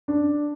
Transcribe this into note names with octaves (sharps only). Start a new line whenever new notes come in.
D4